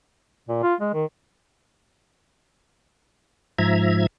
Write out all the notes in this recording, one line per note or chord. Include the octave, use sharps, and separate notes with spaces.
A#2
F4
G#3
D#3
G#2 F3 E5 A#5 G#6